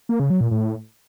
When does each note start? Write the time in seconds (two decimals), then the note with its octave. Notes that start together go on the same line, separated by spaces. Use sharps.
0.09 A#3
0.20 C#3
0.30 F#3
0.41 A#2
0.51 A2